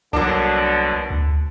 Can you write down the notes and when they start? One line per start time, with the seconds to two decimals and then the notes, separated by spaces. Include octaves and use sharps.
0.13 C2 B2 D3 F#3 A#3 D4
1.10 D2